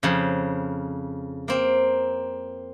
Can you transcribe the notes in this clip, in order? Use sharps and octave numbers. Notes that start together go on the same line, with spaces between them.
F2 C#3
A#3 C4